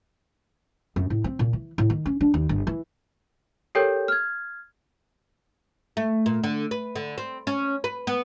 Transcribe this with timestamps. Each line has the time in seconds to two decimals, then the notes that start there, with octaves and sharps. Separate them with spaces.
0.96 F#2
1.10 A2
1.24 C4
1.39 A#2
1.53 E3
1.78 A2
1.90 D#3
2.06 C#4
2.21 D4
2.34 D#2
2.49 G1
2.67 E3
3.75 G4 A4 A#4 C#5 G5 G6
4.08 F6 G#6
5.97 A3
6.26 A#2
6.44 D3
6.71 B4
6.96 D3
7.18 C4
7.47 C#4
7.84 B4
8.07 B3